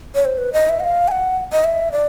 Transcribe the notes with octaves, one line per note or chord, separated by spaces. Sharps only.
C#5
C5
B4
D#5
E5
F#5
F5
G#5
F#5
D#5
E5
D5